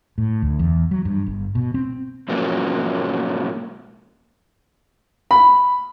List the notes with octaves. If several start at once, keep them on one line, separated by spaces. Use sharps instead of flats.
A2
D2
E2
F#3
G2
G1
B2
C4
G#2 B2 F3 F#3 A#3 C#4
B5